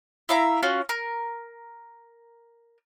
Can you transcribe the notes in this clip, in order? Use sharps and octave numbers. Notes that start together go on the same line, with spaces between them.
E4 E5 F5 A#5
C#4 F4 F#4
A#4